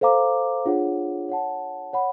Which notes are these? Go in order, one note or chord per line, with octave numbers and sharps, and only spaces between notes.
A4 C5 F5 A#5 D6
D4 F4 G#4 C#5 F#5
C#5 F#5 A5
C#5 F#5 B5